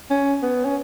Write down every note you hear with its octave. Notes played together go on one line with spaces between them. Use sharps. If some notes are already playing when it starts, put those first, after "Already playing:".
C#4
B3
C#4